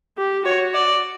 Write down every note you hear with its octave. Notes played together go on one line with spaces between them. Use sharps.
G4
F#4 C#5
D5